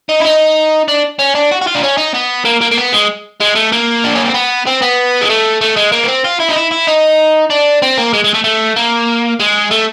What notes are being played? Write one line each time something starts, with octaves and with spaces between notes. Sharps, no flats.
D#4
E4
D#4
D4
C#4
D4
F#4
F#4
F4
D4
C#4
D#4
B3
A#3
A#3
A#3
B3
G#3
G#3
A3
A#3
D4
C#4
C4
B3
C4
B3
G#3
A3
A3
G#3
A#3
B3
C4
F4
E4
D#4
E4
E4
D#4
D4
C4
A#3
G#3
G#3
A3
A3
A#3
G#3
A3